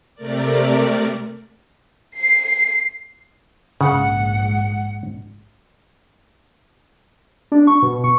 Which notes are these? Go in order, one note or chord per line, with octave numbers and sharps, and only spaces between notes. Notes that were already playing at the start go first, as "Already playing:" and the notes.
C3 A3 A#4 D5
C7
A#1 G#2 C#3 F#5
D4
C#6
B2
C#6